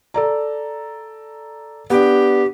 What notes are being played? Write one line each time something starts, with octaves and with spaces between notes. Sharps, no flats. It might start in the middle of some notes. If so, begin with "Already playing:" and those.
A4 D5 A#5
B3 D4 G4